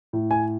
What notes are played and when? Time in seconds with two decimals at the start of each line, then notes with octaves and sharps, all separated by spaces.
0.13 A2
0.31 G#5